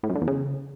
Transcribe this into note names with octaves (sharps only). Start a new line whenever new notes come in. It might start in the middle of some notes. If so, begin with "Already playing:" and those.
A2
F#2
D3
E2
C#3